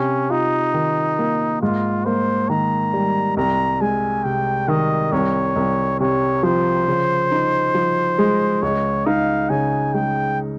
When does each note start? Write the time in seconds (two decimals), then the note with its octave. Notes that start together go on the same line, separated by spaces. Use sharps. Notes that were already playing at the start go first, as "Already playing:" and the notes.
Already playing: C3 C#4
0.30 D#4 F4
0.74 D#3
1.19 A#3
1.61 G#2 F4
2.06 A#3 C5
2.49 D#3 A#5
2.93 G3
3.37 C2 A#5
3.81 G#3 G#5
4.24 C3 G5
4.68 D#3 D#5
5.12 C2 C#5
5.56 C2
6.00 C3 C#5
6.43 F3 C5
6.88 C#3
7.32 D#4
7.75 F3
8.18 G#3
8.62 C#2 C#5
9.06 D#4 F5
9.50 C#3 G#5
9.93 G#3 G5